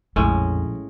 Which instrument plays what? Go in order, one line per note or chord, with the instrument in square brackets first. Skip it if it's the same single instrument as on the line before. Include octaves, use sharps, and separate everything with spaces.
[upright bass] A#1 [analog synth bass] F2 [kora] A2 G#3 C#4